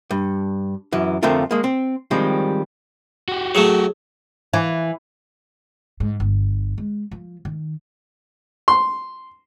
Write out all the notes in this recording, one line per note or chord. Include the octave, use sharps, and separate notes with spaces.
G2
F#2 E3
F2 D3 A3 C4 F4 A#4
G#3 A#3
C4
D#3 F3 G3 G#3 C4
F#4 G4
F#3 A3 G#4 C#7 E7
E3
G#2
G1
G#3
F3
D#3
C6